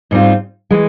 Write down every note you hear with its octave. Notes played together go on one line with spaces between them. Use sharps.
G#2 G3 C4 F4
E3 G#3